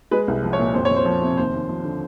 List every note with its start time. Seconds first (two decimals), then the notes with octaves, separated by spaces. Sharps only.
0.11 G#3 B4
0.28 C2
0.43 F3
0.53 C#5
0.59 A#2
0.75 F2 C5
0.85 C#5
0.91 F2
0.96 C5
1.06 F3
1.22 C3
1.38 D#2 C5
1.54 D#2
1.69 F3
1.84 D3